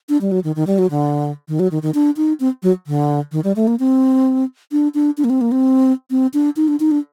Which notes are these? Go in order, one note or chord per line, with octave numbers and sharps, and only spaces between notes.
D4
G3
F#3
D#3
D#3
G3
F#3
D3
D#3
F#3
D#3
D#3
D4
D#4
C4
F#3
D3
D#3
G3
A3
A#3
C4
D4
D4
D4
A#3
C4
A#3
C4
C4
D4
D#4
D4
D#4
D4